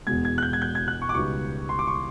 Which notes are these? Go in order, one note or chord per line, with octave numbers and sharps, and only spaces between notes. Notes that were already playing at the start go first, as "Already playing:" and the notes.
E1 E2 B2 G#3 G#6
G#6
F#6
G6
G#6
G6
G#6
F#6
C#6
D6
C#2 B2 G3 B3 D#4 C#6
C6
D6
C#6